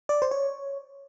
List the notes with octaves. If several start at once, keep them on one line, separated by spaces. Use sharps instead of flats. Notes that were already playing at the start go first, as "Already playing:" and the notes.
D5
C5
C#5